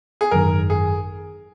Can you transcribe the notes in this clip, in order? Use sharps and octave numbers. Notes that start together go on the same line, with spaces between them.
G#4
G#1 F#2 D#3 A#4
G#4